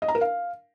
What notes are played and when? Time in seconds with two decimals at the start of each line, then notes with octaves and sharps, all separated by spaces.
0.02 D#5
0.08 A#5
0.15 A#4
0.21 F5